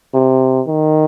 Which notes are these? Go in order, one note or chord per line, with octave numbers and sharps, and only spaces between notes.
C3
D#3